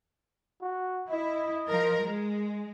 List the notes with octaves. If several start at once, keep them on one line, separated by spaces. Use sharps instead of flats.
F#4
E4 D#5
F3 A#4
G#3